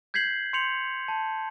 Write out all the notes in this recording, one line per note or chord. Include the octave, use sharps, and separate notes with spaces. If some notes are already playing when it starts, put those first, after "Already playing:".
G6 G#6 B6 C7 F#7
C6 G6 C#7 F7 F#7
A5